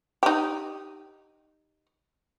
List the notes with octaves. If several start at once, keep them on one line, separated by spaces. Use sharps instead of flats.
D#4 G4